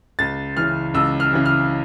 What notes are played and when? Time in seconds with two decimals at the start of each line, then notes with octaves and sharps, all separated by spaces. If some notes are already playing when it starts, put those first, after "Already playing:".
0.19 C#2 A6
0.57 C#3 E3 F6
0.94 C#2 E6
1.20 F6
1.33 C#3 E3
1.46 F6